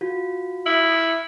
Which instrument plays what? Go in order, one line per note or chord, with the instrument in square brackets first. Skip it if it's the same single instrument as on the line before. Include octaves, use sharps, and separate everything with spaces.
[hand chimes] F4 F#4
[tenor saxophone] E4